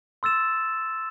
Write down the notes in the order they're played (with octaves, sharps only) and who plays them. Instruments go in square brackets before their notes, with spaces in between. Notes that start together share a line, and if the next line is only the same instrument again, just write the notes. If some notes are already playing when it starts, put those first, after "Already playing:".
[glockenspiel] C6 E6 A6 E7